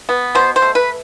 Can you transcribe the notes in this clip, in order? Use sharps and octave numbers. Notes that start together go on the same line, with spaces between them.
B3
B2 C5
C5
A3
B4